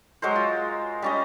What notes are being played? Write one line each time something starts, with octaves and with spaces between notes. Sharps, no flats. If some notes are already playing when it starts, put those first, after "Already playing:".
F#3 G#3 A#4 C5
F4
G3 C#4 D#5